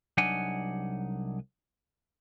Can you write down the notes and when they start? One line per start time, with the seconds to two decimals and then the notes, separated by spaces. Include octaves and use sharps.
0.17 C2 F#3 D4 D#4 F#5 G#5